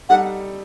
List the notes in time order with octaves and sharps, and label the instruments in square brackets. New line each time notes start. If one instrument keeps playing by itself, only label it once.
[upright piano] G3 D#4 A4 [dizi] F#5